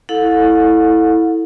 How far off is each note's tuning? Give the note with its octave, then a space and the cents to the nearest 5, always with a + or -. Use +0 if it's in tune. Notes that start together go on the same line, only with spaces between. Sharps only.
E4 -15 A4 +0 F#5 -45